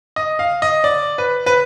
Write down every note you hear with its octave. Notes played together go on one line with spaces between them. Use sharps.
D#5
F5
D#5
D5
B4
B4